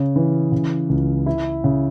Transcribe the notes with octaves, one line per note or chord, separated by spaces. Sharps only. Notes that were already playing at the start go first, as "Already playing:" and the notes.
Already playing: C#3 C#4
E3
C#3
C#2
E4
C#3